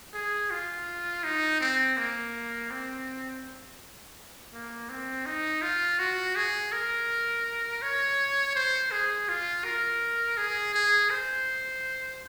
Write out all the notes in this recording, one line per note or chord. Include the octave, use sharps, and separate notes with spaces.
G#4
F4
D#4
C4
A#3
C4
A#3
C4
D#4
F4
F#4
G#4
A#4
C#5
C5
G#4
F4
A#4
G#4
G#4
C5